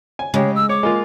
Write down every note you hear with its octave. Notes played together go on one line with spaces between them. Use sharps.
G#5
C#3 G#3 G4 C#5
E6
C#5 D6
G#3 A#3 F4